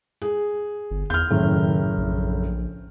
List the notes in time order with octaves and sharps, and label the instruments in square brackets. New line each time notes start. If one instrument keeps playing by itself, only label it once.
[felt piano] G#4
[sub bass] G1
[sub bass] E2 [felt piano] F6 G6
[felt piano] F#1 A2 [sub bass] D#3
[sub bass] A#1